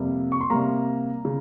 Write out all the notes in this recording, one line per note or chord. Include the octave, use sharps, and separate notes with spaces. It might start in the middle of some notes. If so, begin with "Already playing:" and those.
Already playing: F2 C3 G3 A#3
C#6
C6
C3 G3 A#3 A#5
C#3